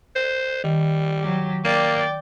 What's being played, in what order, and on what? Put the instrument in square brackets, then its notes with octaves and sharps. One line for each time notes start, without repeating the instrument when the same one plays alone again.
[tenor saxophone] C5
[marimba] D#3 [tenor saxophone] G3
[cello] F#3 G4
[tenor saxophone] A#3 [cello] D5 G5